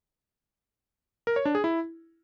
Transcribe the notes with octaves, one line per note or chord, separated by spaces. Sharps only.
A#4
C#5
D4
G#4
E4